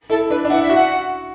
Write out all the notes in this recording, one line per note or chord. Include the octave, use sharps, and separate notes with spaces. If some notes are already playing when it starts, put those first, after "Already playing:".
E4 A4
D4 B4
D4
E4 F#5
E5
F#4
F#5